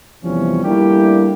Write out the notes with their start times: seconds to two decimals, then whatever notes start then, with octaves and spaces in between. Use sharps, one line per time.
0.23 E2 C3 E3 F3 G3 C#4
0.64 G3 A3 A#3 D4 E4 G4